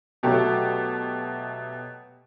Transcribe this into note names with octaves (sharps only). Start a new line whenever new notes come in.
B2 F#3 A3 G4 G5